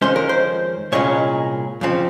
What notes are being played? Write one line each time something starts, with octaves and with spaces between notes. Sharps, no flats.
F2 D#3 G#3 C#4 C5
A#4
C5
C2 A#2 G#3 C#4 C#5
F2 C#3 F3 C4